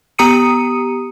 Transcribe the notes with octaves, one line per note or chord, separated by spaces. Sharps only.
B3 G4 A#5 D#6 C#7 D#7